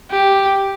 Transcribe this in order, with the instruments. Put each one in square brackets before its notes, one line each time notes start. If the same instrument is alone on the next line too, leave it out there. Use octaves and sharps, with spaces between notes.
[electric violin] G4